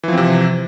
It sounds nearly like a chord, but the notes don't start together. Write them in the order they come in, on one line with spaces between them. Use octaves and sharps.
E3 F3 C4 C3